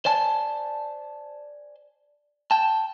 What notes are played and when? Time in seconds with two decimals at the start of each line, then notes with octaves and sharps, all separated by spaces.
0.05 C5 D5 G#5 A5
2.51 G5 A5